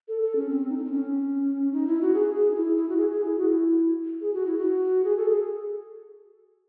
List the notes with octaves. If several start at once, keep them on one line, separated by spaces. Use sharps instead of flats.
A4
A4
C#4
C4
D#4
C#4
C4
C#4
D#4
E4
F#4
G#4
G#4
D#4
E4
E4
F#4
G#4
G#4
E4
F#4
E4
G#4
F#4
E4
F#4
G#4
A4
G#4